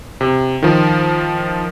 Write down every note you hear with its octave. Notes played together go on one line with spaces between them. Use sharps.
C3
D#3 F3